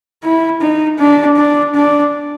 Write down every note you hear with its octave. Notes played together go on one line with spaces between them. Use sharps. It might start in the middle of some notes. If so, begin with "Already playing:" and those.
E4
D#4
D4
D4
D4